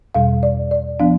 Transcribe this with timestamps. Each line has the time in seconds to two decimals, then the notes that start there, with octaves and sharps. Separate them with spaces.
0.15 E2 B2 G3 F5
0.43 D5
0.71 D5
1.00 F3 B3 D4 F5